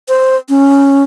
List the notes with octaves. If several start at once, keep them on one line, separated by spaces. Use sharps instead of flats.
C5
C#4